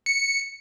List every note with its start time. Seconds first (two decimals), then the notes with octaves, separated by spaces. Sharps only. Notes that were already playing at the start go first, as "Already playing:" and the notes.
0.06 C#7